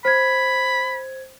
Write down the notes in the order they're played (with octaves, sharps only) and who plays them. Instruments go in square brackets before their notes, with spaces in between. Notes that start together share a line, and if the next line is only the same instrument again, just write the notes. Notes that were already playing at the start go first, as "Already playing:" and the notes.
[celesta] C5 G#6 [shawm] B5